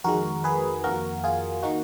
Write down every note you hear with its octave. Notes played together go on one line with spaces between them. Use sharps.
F2 D#3 G#3 F#4 A#4
G#4 B4
F2 D#3 A#3 F#4 A#4
F4 G#4
D#3 A#3 D#4 F#4